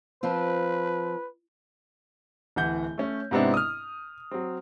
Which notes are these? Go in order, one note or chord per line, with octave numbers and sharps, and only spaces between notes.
F3 C4 F4 B4
D1 E3 F#5 G6
A3 C#4
G#2 C3 B3 C4 D4 E4
D#6 F6
F#3 C4